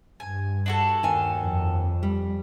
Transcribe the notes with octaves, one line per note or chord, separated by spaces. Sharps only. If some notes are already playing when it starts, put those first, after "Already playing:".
G2 G#5
D4 F#4 A4
D#2 G#5
F2
G3